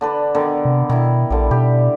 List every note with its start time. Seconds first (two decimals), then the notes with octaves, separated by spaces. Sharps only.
0.01 D3 D4 B4
0.35 B2 D3 D#3
0.65 C3
0.90 B2 D#3 E4
1.30 A#1 D3 G3
1.51 B2 G4